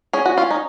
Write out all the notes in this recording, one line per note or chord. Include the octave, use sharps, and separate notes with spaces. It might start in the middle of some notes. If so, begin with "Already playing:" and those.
C#4 G#4
F#4
C#4 F4
D#4